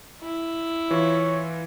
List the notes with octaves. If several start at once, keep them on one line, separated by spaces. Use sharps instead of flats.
E4
E3 F4 C#5